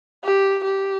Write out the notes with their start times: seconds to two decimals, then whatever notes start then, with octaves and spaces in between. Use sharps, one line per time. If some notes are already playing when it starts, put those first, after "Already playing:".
0.24 G4
0.65 G4